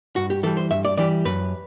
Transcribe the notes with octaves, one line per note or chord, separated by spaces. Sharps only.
G2 F#4
G4
E3 G3 A4
C5
G2 E5
D5
E3 G3 D5
F#2 B4